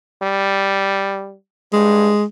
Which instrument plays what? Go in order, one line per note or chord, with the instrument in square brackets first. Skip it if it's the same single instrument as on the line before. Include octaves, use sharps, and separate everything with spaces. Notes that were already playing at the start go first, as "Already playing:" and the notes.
[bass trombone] G3
[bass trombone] G2 [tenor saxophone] G#3